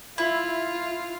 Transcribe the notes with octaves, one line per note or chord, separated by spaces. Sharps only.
E4 F4